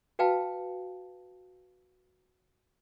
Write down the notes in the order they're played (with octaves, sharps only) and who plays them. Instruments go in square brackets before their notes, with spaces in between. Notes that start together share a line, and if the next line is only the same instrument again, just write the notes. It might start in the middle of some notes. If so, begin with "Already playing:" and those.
[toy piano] F#4 B4 F5 G5 A5